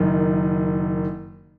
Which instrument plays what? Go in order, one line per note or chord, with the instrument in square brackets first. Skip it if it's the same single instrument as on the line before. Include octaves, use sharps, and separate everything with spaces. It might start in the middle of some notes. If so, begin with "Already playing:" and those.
Already playing: [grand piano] F#1 F#2 D#3